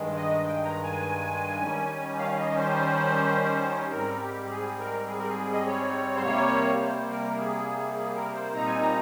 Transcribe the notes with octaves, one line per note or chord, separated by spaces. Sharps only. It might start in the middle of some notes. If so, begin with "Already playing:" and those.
Already playing: G2 D#3 G#3
D#5
G5
A#5
G#5
D#3 G3 C#4
F5
F5
D#5
C5
G#2 G3 C4 A#4
G4
G4
G#4
A#4
G#4
A#4
G#4
D#5
C#5
C5
C3 G3 A#3 C#5
C5
A#4
G#4
G#4
A#4
C5
A#2 G3 C4 D#4 A#5
G#5
A#5